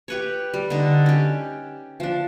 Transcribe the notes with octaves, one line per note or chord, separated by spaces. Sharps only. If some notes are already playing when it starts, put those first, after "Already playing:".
G4 B4 C#5
G3
D3 D#4
C#4 G4
F3 D4